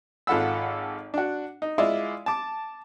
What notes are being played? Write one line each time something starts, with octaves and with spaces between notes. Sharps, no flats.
G#1 F4 A4 F#5 B5 E6
D4 F#4
D#4
G#3 E4 F4 D5 E5 F5
A5 D6